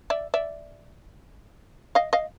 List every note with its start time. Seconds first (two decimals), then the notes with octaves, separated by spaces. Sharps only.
0.10 D5 E5
0.34 D5 E5
1.95 D#5 F5
2.13 D#5 F5